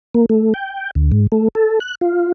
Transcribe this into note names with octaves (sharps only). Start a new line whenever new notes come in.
A#3
A3
G5
D2
G#2
A3
A4
F#6
F4